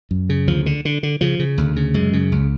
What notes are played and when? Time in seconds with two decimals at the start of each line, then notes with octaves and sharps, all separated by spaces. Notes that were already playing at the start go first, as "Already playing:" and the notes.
0.11 F#2
0.29 C#3
0.47 D2 F3
0.66 D3
0.85 D3
1.03 D3
1.21 C#3 F3
1.39 C#3
1.58 D2
1.76 C#3
1.94 F#2 G#3
2.13 C#3
2.32 C#2